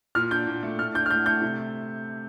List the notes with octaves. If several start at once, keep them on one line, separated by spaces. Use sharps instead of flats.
A#2 F6
D4 G6
A#2
A3
A2 F6
D4 G6
F6
A2 G6
A3 G6
C3